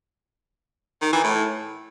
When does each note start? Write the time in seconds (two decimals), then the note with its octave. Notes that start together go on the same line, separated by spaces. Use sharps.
1.02 D#3
1.13 E3
1.24 A2